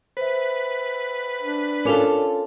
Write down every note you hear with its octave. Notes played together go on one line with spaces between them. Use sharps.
B4 C5 E5
D4
C#4 F4 A4 A#4 D6 F7